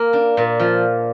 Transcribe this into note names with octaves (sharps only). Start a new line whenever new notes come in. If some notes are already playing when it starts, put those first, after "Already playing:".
Already playing: A#3
D4
A#2
F3